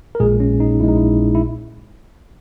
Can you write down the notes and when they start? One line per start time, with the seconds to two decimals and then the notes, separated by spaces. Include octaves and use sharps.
0.15 A#4
0.20 A#1 A#2 G#3 G#4
0.40 C#4
0.60 D#4
0.80 A#1 A#2 G#3 E4
0.89 D#4
0.97 E4
1.35 E4